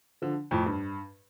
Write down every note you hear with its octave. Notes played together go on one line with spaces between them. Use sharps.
D3 F3
F2 A2
G2